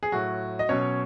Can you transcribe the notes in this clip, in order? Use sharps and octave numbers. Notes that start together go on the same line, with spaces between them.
G#4
A2 F#3 F#4
D#5
B2 F#3 C#4 C#5